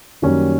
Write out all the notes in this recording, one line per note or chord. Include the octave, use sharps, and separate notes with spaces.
F#2 D#3 G3 A#3 C#4